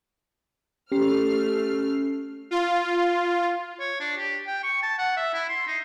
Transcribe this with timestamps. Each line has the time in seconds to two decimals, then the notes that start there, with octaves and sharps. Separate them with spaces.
0.92 A3 C#4 G4 F6 C7
2.51 F4
3.80 C#5
4.00 D4
4.18 G4
4.47 G5
4.63 C#6
4.83 A5
4.98 F#5
5.17 E5
5.34 E4
5.49 C6
5.67 D#4